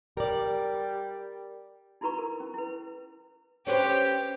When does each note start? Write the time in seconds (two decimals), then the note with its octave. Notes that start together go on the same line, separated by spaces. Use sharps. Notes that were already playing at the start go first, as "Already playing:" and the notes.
0.17 G3 A#4 D5
2.01 D#4 E4 F#4 B4 A#5 C#6
2.18 A#4
2.40 C#4
2.54 E4 B4
3.67 C#4 G4 B4 C5